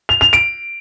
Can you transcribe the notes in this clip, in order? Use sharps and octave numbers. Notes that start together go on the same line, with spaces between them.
F7
F7
D7